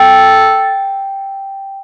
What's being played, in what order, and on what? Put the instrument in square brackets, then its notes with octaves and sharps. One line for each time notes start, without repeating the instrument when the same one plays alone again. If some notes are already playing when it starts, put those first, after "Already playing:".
Already playing: [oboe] A4 [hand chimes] G5